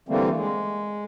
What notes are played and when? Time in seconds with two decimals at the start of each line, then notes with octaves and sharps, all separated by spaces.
0.09 D3 E3 G3 A3 A#3 C4
0.35 G#3